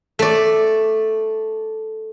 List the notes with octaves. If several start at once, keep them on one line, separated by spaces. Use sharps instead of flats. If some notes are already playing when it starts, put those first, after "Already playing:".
A3 D5